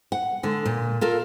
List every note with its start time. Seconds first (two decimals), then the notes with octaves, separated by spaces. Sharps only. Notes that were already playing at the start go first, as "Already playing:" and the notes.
0.12 F#5
0.43 D3 G#3
0.65 A#2
1.01 F4 A4 A#4